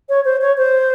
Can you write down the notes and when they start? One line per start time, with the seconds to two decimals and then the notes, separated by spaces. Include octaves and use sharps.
0.09 C#5
0.25 C5
0.41 C#5
0.57 C5